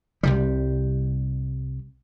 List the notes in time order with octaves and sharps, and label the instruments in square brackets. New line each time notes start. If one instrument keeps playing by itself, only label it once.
[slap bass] C2 C3 G3